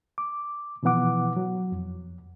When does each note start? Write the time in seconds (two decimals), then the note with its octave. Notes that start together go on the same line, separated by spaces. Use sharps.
0.18 D6
0.83 B2 E3 F3 B3 F#5 D6
1.36 F#3
1.72 F2